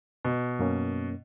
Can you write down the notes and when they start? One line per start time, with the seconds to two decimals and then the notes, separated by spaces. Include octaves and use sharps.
0.25 B2
0.59 F#2 A#3 C#4